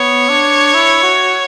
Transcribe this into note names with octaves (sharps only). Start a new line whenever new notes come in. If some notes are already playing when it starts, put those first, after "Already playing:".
Already playing: B3 C#5
D4
E4
F#4